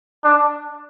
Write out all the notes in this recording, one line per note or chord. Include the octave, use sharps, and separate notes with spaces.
D4